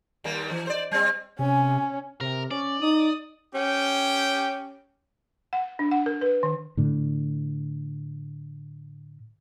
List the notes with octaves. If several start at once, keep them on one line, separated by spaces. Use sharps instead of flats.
D#2 G3 A#3
E3
C5 D5
G3 C4
C3 C#4 G#5
C3 A#4
C#4 D5
D#4 D#6
C#4 G4 G5
F#5
D4
F#5
A#4
B4
D#3
A2 D3